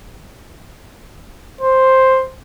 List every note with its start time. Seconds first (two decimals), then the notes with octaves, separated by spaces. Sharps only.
1.61 C5